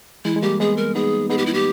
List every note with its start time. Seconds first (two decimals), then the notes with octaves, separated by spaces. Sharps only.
0.25 E3 G#3 E4
0.36 G#3
0.42 G3 A#3 G4
0.60 G#3 B3 G#4
0.77 A#4
0.95 B3 D#4 G#4
1.30 B3 D#4 G#4
1.38 G4
1.46 E4
1.54 G4